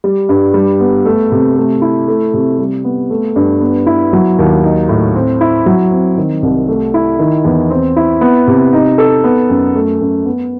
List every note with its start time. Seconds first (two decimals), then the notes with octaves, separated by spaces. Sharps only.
0.04 G3
0.29 G2
0.54 G3
0.80 B3
1.05 A3
1.32 C3
1.57 A3
1.82 E4
2.08 A3
2.34 C3
2.58 G3
2.84 B3
3.10 A3
3.36 G2
3.61 B3
3.86 E4
4.13 F#3
4.39 D#2
4.64 D#4
4.89 A2
5.15 C4
5.41 E4
5.66 F#3
5.91 C4
6.17 D#3
6.42 C2
6.68 A3
6.94 E4
7.19 D#3
7.45 E2
7.70 C4
7.96 E4
8.21 B3
8.47 C3
8.73 D#4
8.98 A4
9.24 B3
9.50 F#2
9.76 A3
10.01 F#2
10.25 B3